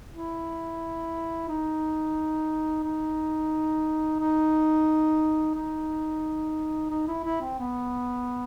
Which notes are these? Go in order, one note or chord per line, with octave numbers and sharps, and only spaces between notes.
E4
D#4
D#4
D#4
D#4
D#4
E4
E4
C4
B3